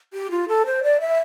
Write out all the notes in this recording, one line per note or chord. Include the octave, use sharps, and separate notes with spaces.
G4
F4
A4
C5
D5
E5